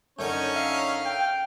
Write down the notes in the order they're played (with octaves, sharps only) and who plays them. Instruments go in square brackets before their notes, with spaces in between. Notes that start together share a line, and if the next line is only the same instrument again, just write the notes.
[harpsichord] F#2 D3 C#6 [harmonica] C#4 D#4 C#5 [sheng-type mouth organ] G6
[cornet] E5 [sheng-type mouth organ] F5 F6
[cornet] G5